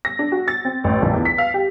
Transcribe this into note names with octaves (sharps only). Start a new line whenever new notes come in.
A#6
D4
F#4
A6
C4
A1
A#1
E2
B6
F5
G4